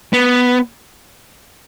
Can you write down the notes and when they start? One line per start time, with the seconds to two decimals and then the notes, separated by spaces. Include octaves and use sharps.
0.13 B3